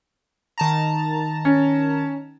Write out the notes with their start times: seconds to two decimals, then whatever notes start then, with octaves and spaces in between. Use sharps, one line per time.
0.58 D#3 A5 A#5
1.45 C#4